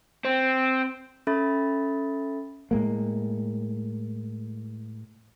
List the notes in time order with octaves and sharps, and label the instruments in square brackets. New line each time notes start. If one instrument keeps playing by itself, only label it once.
[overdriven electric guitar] C4
[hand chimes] C#4 A4 E5 B5 A6
[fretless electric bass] A2 G#3 A#3